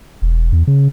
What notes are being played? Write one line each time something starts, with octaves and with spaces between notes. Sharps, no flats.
E1
E2
C#3